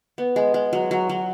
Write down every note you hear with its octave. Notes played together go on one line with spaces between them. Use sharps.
B3
G#3
G#3
F#3
F#3
F#3